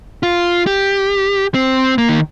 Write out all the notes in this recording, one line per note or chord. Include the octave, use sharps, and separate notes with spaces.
F4
G4
C4
A#3
D#3